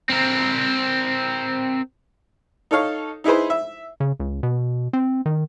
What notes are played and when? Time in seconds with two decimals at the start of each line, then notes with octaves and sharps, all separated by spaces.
0.09 C4 A#4
2.71 D#4 A4 C#5 F5
3.24 D#4 E4 G#4 B4 C5
3.50 E5
4.00 C#3
4.20 C#2
4.43 B2
4.93 C4
5.26 D#3